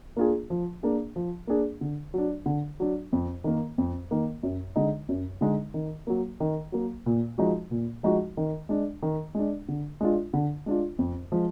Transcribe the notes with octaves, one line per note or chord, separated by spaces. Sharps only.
A#3 D4 F4 G#4
F3
A#3 D4 G#4
F3
A#3 D4 G#4
D3
F#3 D4
D3
F#3 D4
F2
D#3 A#3
F2
D#3 A#3
F#2
D3 G#3 D#4
F#2
D3 G#3 D#4
D#3
F#3 A#3
D#3
F#3 A#3
A#2
F3 G#3 D#4 F#4
A#2
F3 G#3 D#4 F#4
D#3
G#3 D4
D#3
G#3 D4
D3
G#3 D4 F4
D3
G#3 D4 F4
F2
F3 G#3